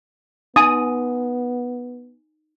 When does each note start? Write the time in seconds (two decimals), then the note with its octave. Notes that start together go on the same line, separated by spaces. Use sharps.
0.56 B3 D#4 G#5 C6 D#6